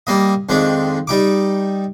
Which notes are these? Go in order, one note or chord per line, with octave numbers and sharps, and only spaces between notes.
G3 A#3 D#5
F2 D#3 G#3 D4
G3 D#4 D6